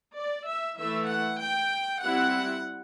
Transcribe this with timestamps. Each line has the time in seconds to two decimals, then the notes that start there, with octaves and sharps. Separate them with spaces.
0.16 D5
0.48 E5
0.78 E3 A3 E4 E5
1.10 F#5
1.41 G5
2.04 G3 C4 E4 F#5